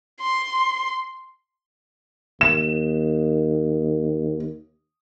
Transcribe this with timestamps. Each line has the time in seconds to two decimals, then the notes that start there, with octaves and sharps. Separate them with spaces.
0.21 C6
2.41 D#2 E7